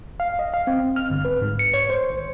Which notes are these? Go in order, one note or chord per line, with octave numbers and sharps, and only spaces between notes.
F5
D#5
F5
C4
F6
G1
B4
G#2
C#7
C#5
C5
G#1